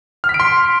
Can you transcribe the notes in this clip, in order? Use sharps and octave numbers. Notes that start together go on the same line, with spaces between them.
F6
B6
D7
C6